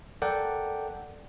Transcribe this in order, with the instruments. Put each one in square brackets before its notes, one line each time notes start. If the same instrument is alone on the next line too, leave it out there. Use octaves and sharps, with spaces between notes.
[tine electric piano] A4 A#4 D5 F#5 G5